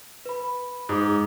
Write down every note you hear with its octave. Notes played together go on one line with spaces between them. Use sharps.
B4 B5
G#2 D6 D#6